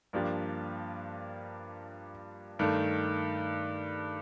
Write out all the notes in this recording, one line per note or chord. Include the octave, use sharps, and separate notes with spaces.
G2 F3 A#3 D4 G4
G2 D#3 A3